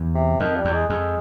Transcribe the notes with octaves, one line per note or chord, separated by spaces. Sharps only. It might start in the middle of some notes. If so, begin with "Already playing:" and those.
Already playing: E2
C3
F2 D#3
G3
E2
G#3
F2 G#3